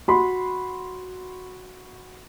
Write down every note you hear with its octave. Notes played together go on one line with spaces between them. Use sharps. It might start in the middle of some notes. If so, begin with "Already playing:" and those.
F#4 B5 C6